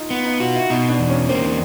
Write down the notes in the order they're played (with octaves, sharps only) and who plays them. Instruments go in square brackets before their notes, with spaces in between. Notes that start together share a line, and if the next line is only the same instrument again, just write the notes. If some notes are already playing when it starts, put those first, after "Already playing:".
Already playing: [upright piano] D#4 F4
[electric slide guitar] B3
[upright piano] D#4
[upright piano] F4 [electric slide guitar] F#4
[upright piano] E4
[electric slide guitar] B2 [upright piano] D#4
[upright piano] D4
[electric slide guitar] E2
[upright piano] C#4
[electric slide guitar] A#3 [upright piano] C4